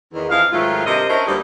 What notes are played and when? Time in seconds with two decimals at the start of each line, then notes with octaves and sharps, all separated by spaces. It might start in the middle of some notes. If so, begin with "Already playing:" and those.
0.14 E2 D#3
0.30 F2 E3 D#4 F5
0.52 G#2 D#3 F#3 A3 F4
0.86 G2 C3 A#4 C5 D#5
1.09 C#4 D4 E4 F#4 A#4 C5
1.27 D2 G3 A#3 D#4 G4 B4